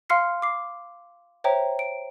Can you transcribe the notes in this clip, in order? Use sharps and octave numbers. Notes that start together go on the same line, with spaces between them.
F5 C6 F6 C7 C#7
D6 C7
C5 C#5 E5 G5 A#5
D7